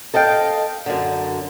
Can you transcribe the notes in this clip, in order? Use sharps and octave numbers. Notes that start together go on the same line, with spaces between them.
A4 D#5 F5 G5
F#2 D3